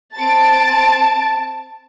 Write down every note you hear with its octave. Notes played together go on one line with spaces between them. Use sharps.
C4 A5 A6 D7